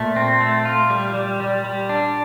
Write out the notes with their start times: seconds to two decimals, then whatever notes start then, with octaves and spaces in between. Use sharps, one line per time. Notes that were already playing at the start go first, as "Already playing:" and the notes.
Already playing: A#2 A3
0.16 C4
0.41 A3
0.65 F4
0.90 G3
1.14 G3
1.40 G3
1.64 G3
1.89 D4